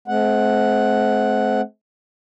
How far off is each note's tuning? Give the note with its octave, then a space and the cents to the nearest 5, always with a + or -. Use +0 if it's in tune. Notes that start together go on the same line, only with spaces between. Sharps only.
A3 -45 C4 +0 F#5 +0